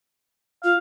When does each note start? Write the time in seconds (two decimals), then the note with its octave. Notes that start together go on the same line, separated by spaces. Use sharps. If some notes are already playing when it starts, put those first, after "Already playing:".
0.64 F4 F5